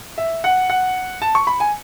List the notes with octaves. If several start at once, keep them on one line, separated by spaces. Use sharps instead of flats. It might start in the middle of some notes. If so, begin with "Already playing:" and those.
E5
F#5
F#5
A5
C#6
B5
G#5